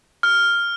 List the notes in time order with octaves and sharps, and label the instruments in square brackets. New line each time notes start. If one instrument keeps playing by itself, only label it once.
[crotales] F6